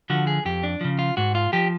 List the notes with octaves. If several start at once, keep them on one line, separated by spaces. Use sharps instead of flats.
D3 F3 F#4
G#4
F2 G4
D4
C#3 F3
F4
G#2 F#4
F4
F3 G4